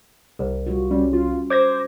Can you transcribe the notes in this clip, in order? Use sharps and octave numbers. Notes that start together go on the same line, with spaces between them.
C2
G3 F4 F#4
G3 C#4
F4
C5 D6 G#6 A#6